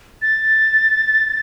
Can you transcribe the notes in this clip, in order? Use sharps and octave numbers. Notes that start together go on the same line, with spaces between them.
A6